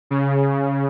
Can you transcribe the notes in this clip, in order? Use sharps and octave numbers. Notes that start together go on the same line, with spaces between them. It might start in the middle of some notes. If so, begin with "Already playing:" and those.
C#3